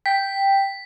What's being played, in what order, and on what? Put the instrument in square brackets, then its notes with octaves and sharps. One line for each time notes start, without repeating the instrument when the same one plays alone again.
[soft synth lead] G5 [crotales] B6